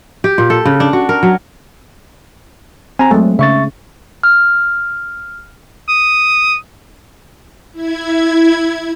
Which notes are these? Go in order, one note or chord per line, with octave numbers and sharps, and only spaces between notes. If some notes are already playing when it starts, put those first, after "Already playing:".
G4
A#2
A4
C#3
D4
F#4
A#4
F#3
C4 G#5 A#5
F#3 G#3 A3
C#3 E5 C#6 A6
F6
D#6
E4 G#6